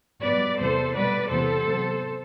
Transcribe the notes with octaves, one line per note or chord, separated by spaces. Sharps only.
B2 G3 B3 B4 D5
E2 C3 G3 B3 A4 C5
B2 G3 B3 B4 D5
E2 C3 E3 B3 A4 C5
C3 F#3 B3